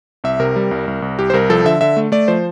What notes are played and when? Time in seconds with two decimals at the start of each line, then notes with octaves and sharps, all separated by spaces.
0.24 C2 E5
0.40 C3 A#4
0.56 G3
0.71 C2
0.88 C2
1.02 C2
1.19 C2 G4
1.30 C5
1.33 C2 A#4
1.50 F3 A4
1.65 D3 E5
1.81 D3 E5
1.97 A3
2.12 A3 D5
2.28 F3 C5